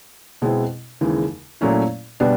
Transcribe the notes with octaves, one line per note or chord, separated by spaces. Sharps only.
B2 G#3 C4 E4
D#2 C#3 E3 G#3
A#2 F#3 A3 C#4 E4
B2 G3 B3 D4